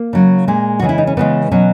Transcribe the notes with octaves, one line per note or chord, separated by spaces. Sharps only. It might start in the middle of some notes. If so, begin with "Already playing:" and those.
Already playing: A#3
C#3 F#3
A#2 G#3
C#3 E3 G#3 F#4
E4
D#4
C#4
C#3 E3 G#3 B3
B2 F#3 C#4